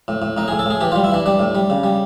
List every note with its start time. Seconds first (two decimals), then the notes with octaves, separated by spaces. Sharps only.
0.08 A2
0.22 A2
0.37 A2 D#4
0.48 A2 G#4
0.59 A4
0.66 A2 G#4
0.81 E3 G4
0.92 G3 F4
1.04 E4
1.11 E3 D4
1.26 G3 D4
1.39 A2
1.55 G3
1.70 C#3
1.84 G3